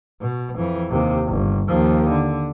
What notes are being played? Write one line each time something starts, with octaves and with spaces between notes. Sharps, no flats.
B2
F2 E3
D#2 C3
G1
D#2 F3
D3